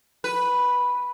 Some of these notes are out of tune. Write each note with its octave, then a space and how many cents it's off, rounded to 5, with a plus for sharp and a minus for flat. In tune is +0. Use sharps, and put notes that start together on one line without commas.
B4 -5